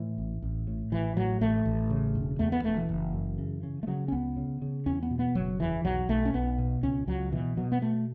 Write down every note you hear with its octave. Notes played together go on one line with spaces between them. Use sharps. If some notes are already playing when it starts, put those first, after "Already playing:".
Already playing: A2 E3
A1
A1
A2
A1 E3
A2 F#3
A1 A3
A1
C#3
E1
E2 A3
B3
E1 A3
E3
F#1
F#2
C#3
C#3
A3
C#3 F#3
C#4
C#2 B3
C#3
C#3
E2 C#4
B3
B2
B3
F#1 F#3
E2 E3
B1 F#3
B1 A3
C#4
B1 B3
B2
C#2 C#4
C#2 F#3
B2 E3
B2 F#3
B3
B2 A3